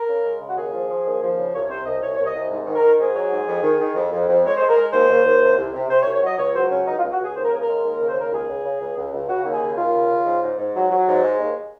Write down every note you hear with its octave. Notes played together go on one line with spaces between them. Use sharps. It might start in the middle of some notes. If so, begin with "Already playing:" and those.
Already playing: A#4
C#3
G#3
C#3
F#4
D#2 G#4
F3
F3
D#2
F3
C#3
C2 C#5
C3 C5
C2 D#5
C2 C#5
C2 C#5
D#5
C2
G#2
D#3
A#4
D#3
G#2 G#4
F#3
G#2
F2
D#3
D#3
F2
F2
F2
G#3 C#5
G#3 C5
A#4
G#3
D#2 C5
D#2
D#2
C3
C2
C3
C3 C5
C#5
C2
C#5
F#3 D#5
C#2 C#5
F#3 C5
C#2 C#4
C#2 D#4
F4
C#2
F#4
C#2 G#4
D#2 C5
A#4
C#3 G#4
A#4
G#3
D#2
C#3
C5
D#2 A#4
C#2 G#4
C#2
C#3
C#2
C#2
C#2
C#3 F#4
D#2
G#4
C#3
D#2 F4
C#3
C#3
G#2
G#2
G#2
F#3
F#3
G#2
G#3
D#2